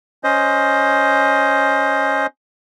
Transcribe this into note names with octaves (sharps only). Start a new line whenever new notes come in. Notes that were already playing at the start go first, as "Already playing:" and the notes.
C#4 C5 D#5